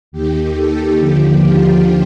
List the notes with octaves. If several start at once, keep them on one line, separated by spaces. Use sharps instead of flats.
D#2 D#3 G4
A4
D#2 D3 F3 G4
F4